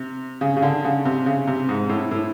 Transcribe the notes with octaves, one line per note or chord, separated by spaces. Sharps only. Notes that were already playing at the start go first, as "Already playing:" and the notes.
Already playing: C3
C#3
C#3
D3
C#3
C3
C#3
C3
G#2
A2
A2